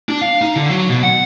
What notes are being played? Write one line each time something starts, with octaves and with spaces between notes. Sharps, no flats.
D4
F5
D#4
D3
F#3
B2
F#5